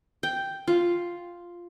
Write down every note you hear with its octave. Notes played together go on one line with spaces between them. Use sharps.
G5
F4